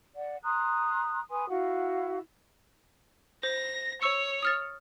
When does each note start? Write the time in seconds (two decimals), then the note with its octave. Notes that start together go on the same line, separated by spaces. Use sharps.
0.17 D5 F#5
0.44 A#5 C6 D#6 F#6
1.30 B4 G#5 C6 D#6
1.49 E4 F#4 F5 F#5
3.43 C5 A#6
4.02 C#5 C#6 E6 C#7
4.42 D#6 F6 A6